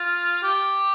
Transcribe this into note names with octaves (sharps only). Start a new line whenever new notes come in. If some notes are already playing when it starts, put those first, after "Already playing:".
Already playing: F4
G4